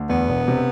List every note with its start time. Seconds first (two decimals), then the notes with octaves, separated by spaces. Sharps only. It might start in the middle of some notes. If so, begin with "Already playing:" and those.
Already playing: D2
0.09 E2 B3
0.29 E1
0.48 C3